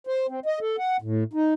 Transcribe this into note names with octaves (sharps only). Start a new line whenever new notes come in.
C5
C4
D#5
A4
F#5
A2
D#4